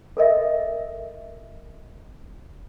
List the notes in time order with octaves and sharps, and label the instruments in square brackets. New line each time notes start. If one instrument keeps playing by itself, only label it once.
[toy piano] A4 A#4 D#5 E5